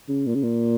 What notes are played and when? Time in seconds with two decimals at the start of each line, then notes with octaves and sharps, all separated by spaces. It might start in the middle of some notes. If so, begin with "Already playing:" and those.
0.08 C#3
0.26 A#2
0.35 C#3
0.43 A#2